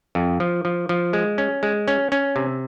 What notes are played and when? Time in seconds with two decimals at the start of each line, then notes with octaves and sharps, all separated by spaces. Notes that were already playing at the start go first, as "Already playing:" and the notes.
0.15 F2
0.40 F3
0.65 F3
0.89 F3
1.13 G#3
1.38 C#4
1.63 G#3
1.88 C#4
2.12 C#4
2.36 C3